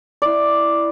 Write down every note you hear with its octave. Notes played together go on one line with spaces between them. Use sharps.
E4 D5